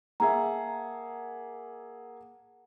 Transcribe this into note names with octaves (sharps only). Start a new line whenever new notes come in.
A#3 G#4 E5 F#5 A5 A#5